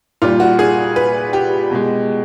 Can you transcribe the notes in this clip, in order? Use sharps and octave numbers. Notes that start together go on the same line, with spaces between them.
A#2 G3 F4
F#4
G#4
B4
G4
B2 G#3